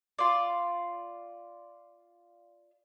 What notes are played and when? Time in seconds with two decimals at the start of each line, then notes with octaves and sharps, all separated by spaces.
0.18 F4 D5